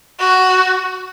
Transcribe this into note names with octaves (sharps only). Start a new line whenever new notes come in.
F#4